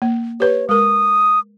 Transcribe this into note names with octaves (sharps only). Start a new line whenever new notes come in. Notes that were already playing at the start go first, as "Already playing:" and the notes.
A#3
G4 B4 C#5
G#3 A#4 D#6